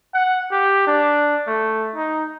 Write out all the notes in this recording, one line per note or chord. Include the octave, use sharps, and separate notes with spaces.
F#5
G4
D4
A3
D#4